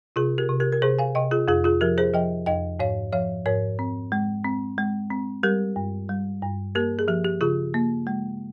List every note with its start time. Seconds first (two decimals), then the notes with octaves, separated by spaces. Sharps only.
0.16 C3 F4 G#4
0.38 G4 A#4
0.49 C3
0.60 G4 A#4
0.72 A#4
0.82 C3 G#4 C5
0.99 F5 G#5
1.15 C3 D#5 G5
1.31 F4 G#4
1.48 F2 F4 G#4
1.64 F4 G#4
1.81 F3 G4 A#4
1.98 G#4 C5
2.14 F3 D#5 G5
2.46 F2 D#5 G5
2.79 G#2 C#5 F5
3.13 F3 C#5 F5
3.46 G#2 A#4 C#5
3.79 C4
4.12 G#3
4.44 C4
4.78 G#3
5.10 C4
5.43 G3 G4 A#4
5.76 G2
6.09 G3
6.42 G2
6.75 A#3 G4 A#4
6.99 G#4
7.08 F3 G4
7.24 G4
7.41 C#3 F4 G#4
7.74 A#3
8.07 G#3